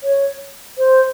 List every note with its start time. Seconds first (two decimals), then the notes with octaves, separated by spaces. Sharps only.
0.03 C#5
0.78 C5